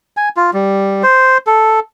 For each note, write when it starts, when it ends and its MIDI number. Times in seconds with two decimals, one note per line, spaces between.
0.17 0.29 80
0.37 0.51 65
0.54 1.03 55
1.03 1.38 72
1.47 1.80 69